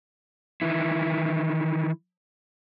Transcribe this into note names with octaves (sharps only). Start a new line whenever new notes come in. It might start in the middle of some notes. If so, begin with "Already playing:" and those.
D#3 E3 E4